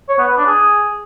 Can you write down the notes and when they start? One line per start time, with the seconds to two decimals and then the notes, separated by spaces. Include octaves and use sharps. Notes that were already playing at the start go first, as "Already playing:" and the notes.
0.09 C#5
0.19 B3
0.28 B4
0.38 D4
0.47 G#4